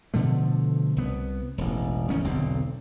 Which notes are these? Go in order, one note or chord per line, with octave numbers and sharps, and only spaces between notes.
B2 D3 F3 A3
C2 B3
E1 A1
G1 E2 D#3 C#4
E1 B1 D3 C4